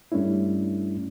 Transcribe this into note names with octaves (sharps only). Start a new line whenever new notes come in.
G2 G3 A3 C#4 D4 E4